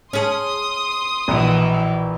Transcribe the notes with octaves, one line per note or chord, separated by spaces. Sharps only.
C#4 G#4 C6 D#6
A#1 B2 E3